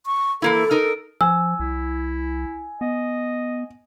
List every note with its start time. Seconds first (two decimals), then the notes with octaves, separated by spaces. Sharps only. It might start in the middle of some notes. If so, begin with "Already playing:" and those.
0.06 C#6
0.42 E3 A#3 E4 A4
0.71 D#4 A#4
1.21 F3 G#5 E6
1.60 C2 E4
2.81 B3 D#5